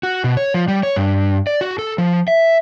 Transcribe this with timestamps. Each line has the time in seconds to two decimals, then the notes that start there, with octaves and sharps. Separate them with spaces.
0.03 F#4
0.24 B2
0.37 C#5
0.54 F3
0.68 G3
0.83 C#5
0.96 G2
1.47 D5
1.61 F#4
1.79 A4
1.98 F3
2.28 E5